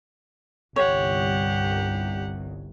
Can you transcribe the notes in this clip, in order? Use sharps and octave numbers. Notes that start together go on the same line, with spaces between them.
G1 C2 G4 C#5 F#5